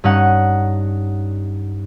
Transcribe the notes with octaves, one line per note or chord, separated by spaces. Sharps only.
G2 C#4 D#4 F#5